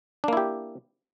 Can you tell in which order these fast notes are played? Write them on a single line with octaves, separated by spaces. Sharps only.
D4 A#3 E4 G4